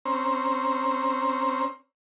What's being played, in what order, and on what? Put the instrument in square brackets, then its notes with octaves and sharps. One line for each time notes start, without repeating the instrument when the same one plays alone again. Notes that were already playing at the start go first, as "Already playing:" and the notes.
[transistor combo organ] C4 C#4 C5 A#5